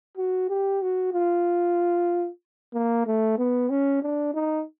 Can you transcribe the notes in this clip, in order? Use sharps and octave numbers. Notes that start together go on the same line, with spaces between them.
F#4
G4
F#4
F4
A#3
A3
B3
C#4
D4
D#4